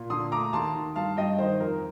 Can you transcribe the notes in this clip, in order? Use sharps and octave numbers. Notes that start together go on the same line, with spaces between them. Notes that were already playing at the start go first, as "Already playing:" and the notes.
Already playing: A#2
D3 C6 D#6
A3 A#5 D6
D#2 A5 C6
D#3
G2 F5 A5
G2 D#5 G5
D#3 C5
F2 A#4